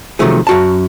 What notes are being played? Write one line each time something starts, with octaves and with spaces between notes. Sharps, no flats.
C3 D#3 F3 F#3 A3 G#4
F#2 F#4 A5